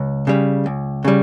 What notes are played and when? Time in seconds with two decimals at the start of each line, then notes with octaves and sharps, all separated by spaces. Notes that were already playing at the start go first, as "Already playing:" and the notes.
Already playing: C#2
0.27 C#3 G3
0.66 C#2
1.04 C#3 G3